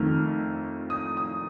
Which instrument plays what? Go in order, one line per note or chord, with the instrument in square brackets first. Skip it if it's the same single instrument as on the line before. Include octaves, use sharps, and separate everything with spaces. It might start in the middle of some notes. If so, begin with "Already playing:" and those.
Already playing: [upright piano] F2 D#3 A3 F6
D#6
D#6